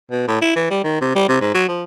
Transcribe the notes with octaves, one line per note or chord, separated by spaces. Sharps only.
B2
A2
E4
E3
G3
D#3
C3
G3
C3
G#2
F#3
F3